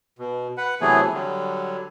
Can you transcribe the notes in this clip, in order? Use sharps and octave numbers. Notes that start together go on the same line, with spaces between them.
B2
B4 F#5
C3 E3 F#3 A3 B3 G#4
D3 F#3 G3